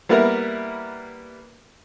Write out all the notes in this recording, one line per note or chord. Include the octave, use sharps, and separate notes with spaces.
G3 A#3 B3 E4 A#4